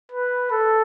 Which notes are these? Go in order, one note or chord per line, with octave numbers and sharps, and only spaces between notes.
B4
A4